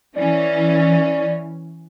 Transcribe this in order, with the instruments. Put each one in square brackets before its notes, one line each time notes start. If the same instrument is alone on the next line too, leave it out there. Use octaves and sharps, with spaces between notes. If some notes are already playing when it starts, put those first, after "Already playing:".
[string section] E3 C#4 [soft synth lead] D5